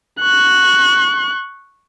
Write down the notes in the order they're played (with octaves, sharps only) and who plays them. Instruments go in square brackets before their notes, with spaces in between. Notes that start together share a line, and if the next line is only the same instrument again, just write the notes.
[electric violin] C#6 F#6